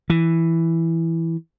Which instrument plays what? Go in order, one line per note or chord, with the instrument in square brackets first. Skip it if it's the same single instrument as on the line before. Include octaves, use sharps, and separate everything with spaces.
[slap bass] E3